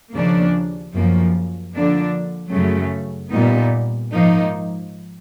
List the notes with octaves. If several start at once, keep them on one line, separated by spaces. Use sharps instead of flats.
D#2 C#3 F3 A#3 D4
F#2 C#3 F3 A#3
D3 F3 A#3 D4
F#2 C#3 F#3 A3
A#2 G3 B3 D#4
G#2 F3 A#3 D#4